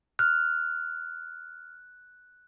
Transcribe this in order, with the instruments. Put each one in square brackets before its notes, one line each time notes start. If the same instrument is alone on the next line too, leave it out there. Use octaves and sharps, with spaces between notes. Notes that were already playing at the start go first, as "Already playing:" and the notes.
[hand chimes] F6 [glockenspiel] F#6